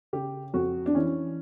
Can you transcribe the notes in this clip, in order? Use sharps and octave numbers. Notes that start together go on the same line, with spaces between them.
C#3 G4
F2 F#4
D4
E3 C#4